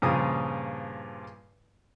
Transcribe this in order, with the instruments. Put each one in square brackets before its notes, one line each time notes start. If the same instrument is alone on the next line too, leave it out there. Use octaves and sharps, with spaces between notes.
[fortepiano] G2 A#2 C#3 F3 D#6